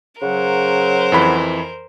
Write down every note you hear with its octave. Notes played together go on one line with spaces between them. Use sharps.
C#3 F#3 A#4 C5 F#5
F2 E3 B5